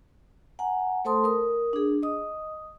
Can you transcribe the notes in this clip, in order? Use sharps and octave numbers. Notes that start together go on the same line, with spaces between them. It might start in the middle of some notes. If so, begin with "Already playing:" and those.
F#5 G#5 A#5
A3 A4 C5 A5 C6 D#6
A#4 D#6
D4 G#4
D#5 D#6